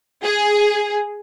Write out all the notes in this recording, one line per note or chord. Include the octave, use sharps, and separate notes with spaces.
G#4